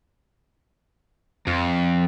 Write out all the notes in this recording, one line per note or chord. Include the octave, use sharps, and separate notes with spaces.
F2